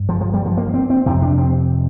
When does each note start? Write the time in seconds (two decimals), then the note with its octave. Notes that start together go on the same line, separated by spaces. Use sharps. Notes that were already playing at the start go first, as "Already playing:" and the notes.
Already playing: G2
0.09 F3
0.21 F3
0.34 G3
0.46 F3
0.57 A#3
0.74 C4
0.90 C4
1.06 F2 C3 C4
1.22 D4
1.38 C4